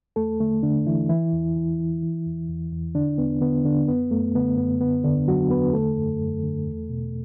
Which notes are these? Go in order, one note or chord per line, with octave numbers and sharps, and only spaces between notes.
E2 A3 A4
D3 A3
D3 D4
D3 E3 E4
E3 E4
E2
E3
E3
E3
E2
E2
E2
D3 D4
E2 B3
D3 B3
D3 D4
F#2 B3
F#2 A3
D3 B3
F#2 B3
D3 B3
E2 D3 D4
D3 F#3 F#4
E2 B3 B4
D3 A3 A4
F#2
F#2
D3
E2
B2